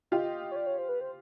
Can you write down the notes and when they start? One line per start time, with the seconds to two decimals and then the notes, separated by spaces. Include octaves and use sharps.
0.11 F4 G4 D#5
0.52 C#5
0.56 D5
0.66 C#5
0.78 C5
0.89 B4
1.01 C5